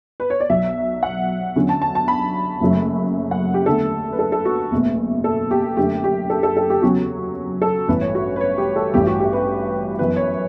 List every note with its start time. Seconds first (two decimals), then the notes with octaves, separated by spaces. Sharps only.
0.20 B4
0.30 C#5
0.40 D5
0.50 B1 B2 F#3 E5
1.03 F#5
1.56 E2 D3 F#3 C#4
1.69 A5
1.82 A5
1.95 A5
2.08 B5
2.61 F#1 F#2 C#3 F#3 A3
3.31 F#5
3.54 G4
3.66 E2 D3 A3 A4
4.13 B4
4.19 A4
4.32 A4
4.45 F#4
4.71 F#1 E2 B2 A3
5.24 A4
5.51 G4
5.77 F#2 D3 A3 G4
6.04 G4
6.30 A4
6.43 A4
6.57 A4
6.70 G4
6.82 E2 C#3 F#3 C#4 F#4
7.62 A4
7.88 A1 G2 E3 B3 B4
8.01 C#5
8.15 F#4
8.36 B4
8.41 C#5
8.58 G4
8.76 A4
8.94 A1 G2 E3 G4
9.07 F#4
9.20 G4
9.33 B4
9.99 F#2 E3 B3 B4
10.16 C#5